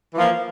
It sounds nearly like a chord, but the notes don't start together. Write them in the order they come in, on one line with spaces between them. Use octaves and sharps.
E3 F3 A#3